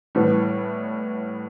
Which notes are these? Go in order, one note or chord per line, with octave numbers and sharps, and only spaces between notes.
A2 E3 G3 B3